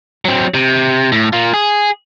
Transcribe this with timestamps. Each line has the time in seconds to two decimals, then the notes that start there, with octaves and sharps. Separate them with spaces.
0.25 F#3 C4
0.54 C3
1.12 A2
1.33 A#3 F4
1.54 G#4